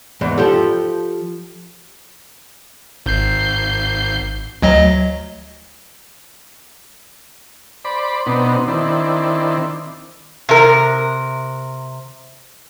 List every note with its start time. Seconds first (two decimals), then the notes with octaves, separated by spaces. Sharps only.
0.21 E2 G#2
0.38 F3 G4 A4
3.06 G#1 G6 C7
4.62 D2 F#3 D#5
7.85 C5 D5 B5
8.26 B2 B3 C4 D4 D#4
8.68 D#3 C4 D4 E4
10.49 C3 A#4